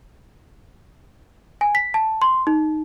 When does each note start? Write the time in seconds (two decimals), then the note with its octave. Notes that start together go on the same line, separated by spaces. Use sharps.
1.61 G#5
1.75 B6
1.94 A5
2.22 C6
2.47 D#4